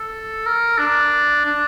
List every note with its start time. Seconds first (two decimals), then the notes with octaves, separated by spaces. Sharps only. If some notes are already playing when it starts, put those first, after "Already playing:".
Already playing: A4
0.46 A#4
0.79 D4
1.45 D4